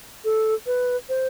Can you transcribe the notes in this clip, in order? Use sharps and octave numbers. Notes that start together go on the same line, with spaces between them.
A4
B4
C5